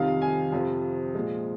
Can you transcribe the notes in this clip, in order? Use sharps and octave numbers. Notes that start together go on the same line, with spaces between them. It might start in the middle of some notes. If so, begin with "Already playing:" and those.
Already playing: F2 C3 D#3 G3 F5
G#5
F2 C3 F3
A#2 F3 G#3